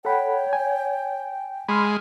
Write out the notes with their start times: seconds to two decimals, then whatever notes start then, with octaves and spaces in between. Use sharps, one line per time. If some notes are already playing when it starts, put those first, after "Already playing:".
0.05 A4 C#5 F#5 G5 B5
0.53 G#5
1.68 G#3 B5 C6 F6